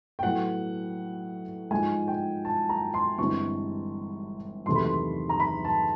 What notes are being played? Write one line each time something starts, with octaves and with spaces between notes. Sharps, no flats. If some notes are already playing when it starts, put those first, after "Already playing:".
G5
A2 F#3 B3 F#5
G#2 F3 G#3 G#5
G5
A5
A#5
C6
G1 G2 E3 G#3 C4 C#6
E2 C3 D#3 F#3 A3 C6
B5
C6
A#5
B5
A5